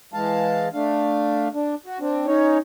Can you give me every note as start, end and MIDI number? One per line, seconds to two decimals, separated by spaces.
0.14 0.68 52
0.14 0.68 56
0.14 0.68 77
0.14 0.68 81
0.74 1.48 57
0.74 1.48 62
0.74 1.48 77
1.54 1.75 62
1.86 1.99 66
2.00 2.26 60
2.00 2.26 62
2.27 2.58 61
2.27 2.58 63
2.27 2.58 73